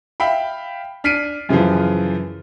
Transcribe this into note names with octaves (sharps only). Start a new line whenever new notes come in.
E5 F5 G5 B5
D4 F6 B6 C7 D7 D#7
F#2 C#3 E3 F3